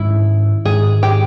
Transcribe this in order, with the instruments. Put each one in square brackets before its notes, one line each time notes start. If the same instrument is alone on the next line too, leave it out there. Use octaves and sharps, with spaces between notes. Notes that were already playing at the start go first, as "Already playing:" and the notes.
Already playing: [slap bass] G#2 D#3 G#3 C#4 [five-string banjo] E4
[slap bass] G#2 D#3 G#3 [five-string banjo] G#4
[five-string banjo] G4